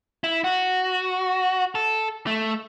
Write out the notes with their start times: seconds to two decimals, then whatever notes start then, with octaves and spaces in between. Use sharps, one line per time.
0.24 E4
0.44 F#4
1.75 A4
2.27 A3